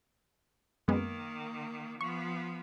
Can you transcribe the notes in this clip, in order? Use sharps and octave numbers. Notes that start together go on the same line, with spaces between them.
F#2 D#3 G#3 A#3 B3
F3 B3 C#6